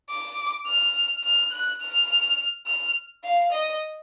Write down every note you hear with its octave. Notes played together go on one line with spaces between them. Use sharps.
D6
F6
F6
F#6
F6
F6
F5
D#5